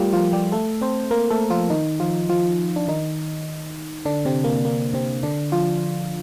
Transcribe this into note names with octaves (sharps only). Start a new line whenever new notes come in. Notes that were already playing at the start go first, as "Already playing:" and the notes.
Already playing: G3 A3 F4 G4 A#4
F3 F4
G3 G4
A3 A4
C4 C5
A#3 A#4
A3 A4
F3 F4
D#3 D#4
F3 F4
F3 F4
D4
D#3 D#4
D3 D4
C3 C4
A#3
A#3
C3 C4
D3 D4
F3 F4